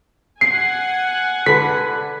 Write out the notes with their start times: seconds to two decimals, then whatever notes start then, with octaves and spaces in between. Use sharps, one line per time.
0.41 F#5 G#5 C7
1.46 D3 B4 B6